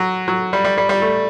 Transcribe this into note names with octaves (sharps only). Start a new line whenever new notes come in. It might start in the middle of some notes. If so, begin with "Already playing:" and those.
Already playing: F#3
F#3
G3
G3
G3
G3
A3